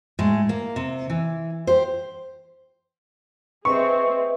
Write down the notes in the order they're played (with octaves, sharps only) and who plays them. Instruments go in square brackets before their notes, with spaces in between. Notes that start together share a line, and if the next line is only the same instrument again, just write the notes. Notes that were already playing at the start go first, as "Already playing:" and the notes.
[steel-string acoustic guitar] A2 G#3
A#3
C3
E3
G4 C5
[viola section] C4 G#4 [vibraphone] B4 D#5 E5 [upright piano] C#6